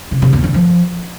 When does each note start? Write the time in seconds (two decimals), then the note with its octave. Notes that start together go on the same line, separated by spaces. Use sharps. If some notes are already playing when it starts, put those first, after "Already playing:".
0.11 C#3
0.22 C#3
0.33 E2
0.43 D3
0.54 F3